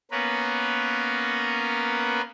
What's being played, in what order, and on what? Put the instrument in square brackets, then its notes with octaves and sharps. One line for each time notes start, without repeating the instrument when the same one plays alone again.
[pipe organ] A#3 B3 C#4 A#4 B4